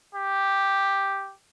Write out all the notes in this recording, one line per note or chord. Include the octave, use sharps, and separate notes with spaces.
G4